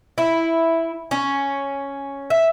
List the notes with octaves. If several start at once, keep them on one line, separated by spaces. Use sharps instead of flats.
E4
C#4
E5